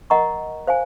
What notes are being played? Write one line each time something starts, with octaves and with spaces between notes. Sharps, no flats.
A#4 D#5 F#5 A#5 C#6
C5 F5 G#5